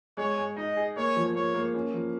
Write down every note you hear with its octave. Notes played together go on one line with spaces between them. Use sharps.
G#3 C#5
G#3
D#4 D#5
G#4
A#3 C#5
F3
A#3 C#5
A#3
C#4
F3